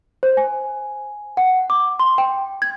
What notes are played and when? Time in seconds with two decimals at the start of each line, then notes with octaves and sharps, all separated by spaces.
0.23 C5
0.37 G#5
1.37 F#5
1.70 D6
2.00 C6
2.18 G5
2.62 G#6